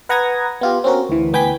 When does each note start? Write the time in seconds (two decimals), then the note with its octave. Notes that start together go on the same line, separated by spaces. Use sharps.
0.09 B4 F#5 A#5 D#6 G#6 A#6
0.61 B3 F4 G4
0.84 C4 C#4 F#4 A#4
1.09 D2 E3
1.33 D2 B3 G5 G#5 G6 B6